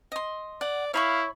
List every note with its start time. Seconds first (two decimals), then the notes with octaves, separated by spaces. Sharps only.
0.12 D#5 C6
0.61 D5 F#5
0.94 E4 C#5 F5 B5 C#6